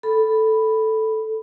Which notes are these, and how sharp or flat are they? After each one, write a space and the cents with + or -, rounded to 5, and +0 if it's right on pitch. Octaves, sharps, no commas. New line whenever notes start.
A4 +0 B5 +0